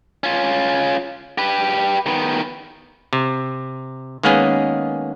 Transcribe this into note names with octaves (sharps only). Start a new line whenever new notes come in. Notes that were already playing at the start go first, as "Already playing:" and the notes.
C#4 F4
G4 B4
D#3 B3
C3
D#3 G#3 A#3 B3 C#4 G#4